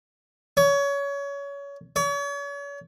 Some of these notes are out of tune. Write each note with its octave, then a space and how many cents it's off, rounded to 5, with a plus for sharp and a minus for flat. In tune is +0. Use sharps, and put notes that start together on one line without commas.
C#5 +25
C#5 +40